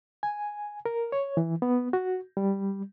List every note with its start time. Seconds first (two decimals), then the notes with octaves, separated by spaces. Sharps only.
0.23 G#5
0.86 A#4
1.12 C#5
1.37 E3
1.62 B3
1.93 F#4
2.37 G3